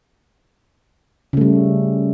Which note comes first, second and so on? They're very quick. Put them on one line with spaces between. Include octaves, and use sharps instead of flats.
C#3 A3 G3